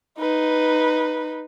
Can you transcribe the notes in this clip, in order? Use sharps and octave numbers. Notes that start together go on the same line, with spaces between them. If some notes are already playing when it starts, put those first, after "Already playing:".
D#4 B4